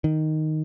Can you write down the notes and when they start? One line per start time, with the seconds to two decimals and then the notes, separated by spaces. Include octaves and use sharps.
0.04 D#3